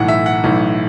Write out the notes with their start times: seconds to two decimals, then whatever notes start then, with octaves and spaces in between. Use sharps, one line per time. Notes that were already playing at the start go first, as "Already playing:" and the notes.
Already playing: B1 A2 E3 F#5
0.08 E5
0.26 F#5
0.44 B1 A2 E3